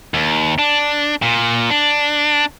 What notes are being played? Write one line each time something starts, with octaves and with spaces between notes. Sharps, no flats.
D#2
D4
A#2
D4